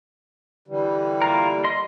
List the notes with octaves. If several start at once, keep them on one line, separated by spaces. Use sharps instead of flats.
D3 E3 G3
A#3 F4 A#4
D#5 C6